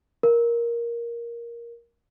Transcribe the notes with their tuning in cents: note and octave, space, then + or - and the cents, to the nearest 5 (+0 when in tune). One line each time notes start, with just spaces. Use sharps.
A#4 +10